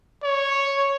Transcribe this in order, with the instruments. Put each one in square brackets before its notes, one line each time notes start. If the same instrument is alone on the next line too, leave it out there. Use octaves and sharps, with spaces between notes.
[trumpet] C#5